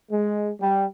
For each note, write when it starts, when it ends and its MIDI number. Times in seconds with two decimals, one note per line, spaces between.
0.10 0.50 56
0.60 0.85 55